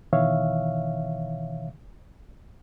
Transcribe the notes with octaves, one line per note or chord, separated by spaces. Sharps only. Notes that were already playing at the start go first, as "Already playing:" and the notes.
B2 D#3 E3 C#5 E5 F5